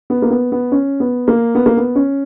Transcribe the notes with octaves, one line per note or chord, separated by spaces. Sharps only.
B3
A#3
B3
B3
C#4
B3
A#3
B3
A#3
B3
C#4